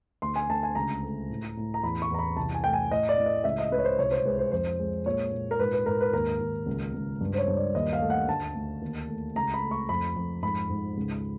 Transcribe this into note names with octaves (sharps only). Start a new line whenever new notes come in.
D2 C6
G#5
D2 A5
G#5
C#2 A#5
A3
A2
A2
A#5
E2 B5
C#6
E2 A#5
B5
C2 A5
G#5
A3 G5
G#5
A2 D#5
D5
A2
D#5
C#2 E5
D#5
C#2 B4
C#5
C5
C2 C#5
C5
G#3 B4
C5
F2 C5
G#3
A#2 C#5
A#2
A#4
G#2 B4
B4
G#2 A#4
B4
D#2 A#4
D#2
C#2
C#2
G2
C5
C#5
G2
D5
D#2 D#5
F5
A3
F#5
D2 A5
D2
D#2
A3
C#2 A#5
B5
A3
C#6
F2 B5
F2
G#2 B5
G#2
C#2